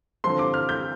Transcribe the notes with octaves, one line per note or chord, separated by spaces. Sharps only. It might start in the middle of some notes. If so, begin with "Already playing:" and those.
D3 F3 C4 C6
D6
F6
G6